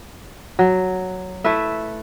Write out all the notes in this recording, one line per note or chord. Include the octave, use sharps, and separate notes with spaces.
F#3
A3 E4 B4 E5